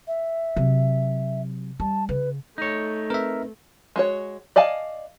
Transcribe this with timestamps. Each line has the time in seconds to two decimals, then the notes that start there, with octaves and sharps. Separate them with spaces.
0.07 E5
0.56 C3 F#3
1.80 G3 A5
2.09 C#3 B4
2.58 A3 D#4 C#5
3.10 C4 A#4 B4 E5
3.96 G#3 F#4 C#5
4.56 D5 D#5 F5 G#5 A5